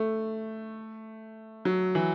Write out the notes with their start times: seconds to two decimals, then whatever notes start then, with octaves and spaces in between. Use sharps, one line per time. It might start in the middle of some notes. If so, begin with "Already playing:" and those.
Already playing: A3
1.65 F#3
1.95 E3